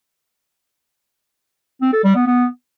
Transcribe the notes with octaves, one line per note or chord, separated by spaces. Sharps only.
C4
A4
G3
B3
B3